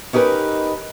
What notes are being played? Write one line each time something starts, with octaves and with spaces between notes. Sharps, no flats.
C#4 D#4 G4 A#4 B4